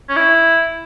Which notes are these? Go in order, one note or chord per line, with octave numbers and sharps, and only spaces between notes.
C#4
E4